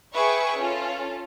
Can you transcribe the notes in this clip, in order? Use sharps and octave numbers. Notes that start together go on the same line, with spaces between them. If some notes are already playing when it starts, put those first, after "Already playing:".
G#4 B4 E5 G5 C#6
C#4 F4 A4